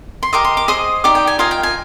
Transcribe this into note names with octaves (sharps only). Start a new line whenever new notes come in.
C6
G4 A#4 D#5 D6
C6
D6
G#4 C5 D#5 D#6
D#4 G4 D5 D6
G5
G#5
F4 A#4 D#5 G#5
G5
G#5